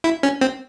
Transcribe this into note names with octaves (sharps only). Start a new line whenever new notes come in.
E4
C#4
C4